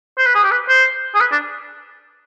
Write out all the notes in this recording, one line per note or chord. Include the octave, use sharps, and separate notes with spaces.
C5
B4
G#4
G4
B4
C5
G#4
B4
D4